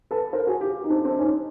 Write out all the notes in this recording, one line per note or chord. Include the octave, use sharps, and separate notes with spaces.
A4 B4
A#4 C5
F#4 G#4
F4 G4
D#4
C4 D4
C4 D4
C#4 D#4